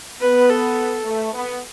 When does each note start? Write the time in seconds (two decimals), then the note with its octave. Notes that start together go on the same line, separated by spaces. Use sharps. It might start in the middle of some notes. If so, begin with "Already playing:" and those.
0.21 B3 B4
0.50 A4
1.05 A3
1.33 B3